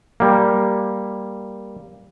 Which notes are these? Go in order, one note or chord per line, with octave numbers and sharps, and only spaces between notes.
G3 A#3